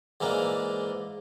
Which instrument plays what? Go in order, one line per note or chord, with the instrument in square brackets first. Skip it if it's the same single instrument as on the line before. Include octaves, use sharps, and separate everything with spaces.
[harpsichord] G#2 E3 A#3 D4